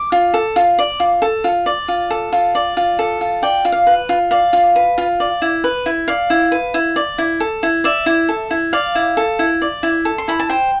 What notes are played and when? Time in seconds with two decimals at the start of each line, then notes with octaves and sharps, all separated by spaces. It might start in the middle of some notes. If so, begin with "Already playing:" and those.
Already playing: D6
0.12 F4
0.34 A4
0.56 F4
0.79 D5
1.00 F4
1.22 A4
1.44 F4
1.66 D5
1.88 F4
2.10 A4
2.32 F4
2.55 D5
2.77 F4
2.99 A4
3.21 F4
3.43 D5 G5
3.65 F4
3.72 F5
3.87 B4
4.09 F4
4.31 D5 F5
4.53 F4
4.76 B4
4.98 F4
5.20 D5
5.42 E4
5.64 B4
5.86 E4
6.08 D5 F5
6.30 E4
6.52 B4
6.74 E4
6.96 D5
7.18 E4
7.40 A4
7.63 E4
7.84 D5 E5
8.06 E4
8.29 A4
8.51 E4
8.73 D5 F5
8.95 E4
9.17 A4
9.39 E4
9.62 D5
9.83 E4
10.05 A4
10.18 C6
10.28 E4 B5
10.39 A5
10.49 C5 G5